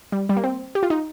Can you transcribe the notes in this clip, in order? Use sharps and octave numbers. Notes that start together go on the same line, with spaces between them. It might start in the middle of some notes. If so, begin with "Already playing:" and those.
G3
G3
A#3
C4
G4
F4
D#4